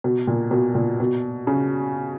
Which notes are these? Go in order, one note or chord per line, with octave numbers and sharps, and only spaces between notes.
B2
A#2
B2
A#2
B2
C#3